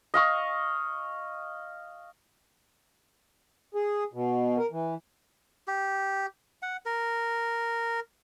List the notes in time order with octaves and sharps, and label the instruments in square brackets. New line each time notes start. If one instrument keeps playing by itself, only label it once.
[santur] D#5 F5 C#6
[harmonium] G#4
B2
A#4
E3
[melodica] G4
F#5
A#4